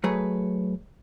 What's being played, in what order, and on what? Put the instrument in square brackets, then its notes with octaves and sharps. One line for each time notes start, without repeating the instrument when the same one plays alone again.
[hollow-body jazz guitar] F#3 A3 G#4 B4 C#5